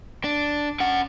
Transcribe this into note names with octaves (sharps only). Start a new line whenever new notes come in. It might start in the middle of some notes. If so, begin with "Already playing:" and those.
D4
C#4 F#5